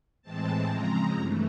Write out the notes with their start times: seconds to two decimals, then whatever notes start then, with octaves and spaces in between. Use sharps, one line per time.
0.22 A2 E3 G#3 C4 A5
0.68 C#3 F3 G#3 C4 A#5
1.14 G2 E3 A3